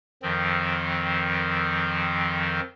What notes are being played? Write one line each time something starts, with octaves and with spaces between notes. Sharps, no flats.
F2 D#3 F3 C4